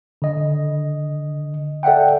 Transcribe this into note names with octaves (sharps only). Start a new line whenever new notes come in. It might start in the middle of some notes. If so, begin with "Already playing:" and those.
D3 D#5
A4 D5 E5 F#5 G5